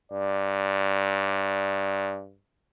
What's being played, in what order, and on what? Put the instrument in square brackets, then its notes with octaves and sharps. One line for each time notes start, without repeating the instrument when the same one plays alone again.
[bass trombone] G2 [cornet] D5